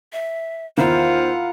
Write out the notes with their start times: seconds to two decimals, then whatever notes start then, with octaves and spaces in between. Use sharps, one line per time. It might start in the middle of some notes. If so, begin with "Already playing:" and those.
0.13 E5
0.77 E2 D#3 E4 F4 A#4 C5 F5 F#5